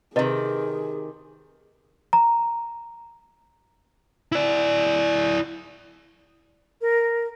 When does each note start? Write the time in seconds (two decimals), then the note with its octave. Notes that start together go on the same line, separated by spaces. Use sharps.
0.16 C3 D#3 G#4 B4 D#5
2.13 A#5
4.32 E4 D5
6.81 A#4